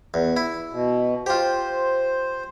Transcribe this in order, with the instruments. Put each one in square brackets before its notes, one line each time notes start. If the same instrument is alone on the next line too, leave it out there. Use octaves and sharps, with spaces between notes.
[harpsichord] E2
E4
[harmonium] B2
[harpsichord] F4 G4 [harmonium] C5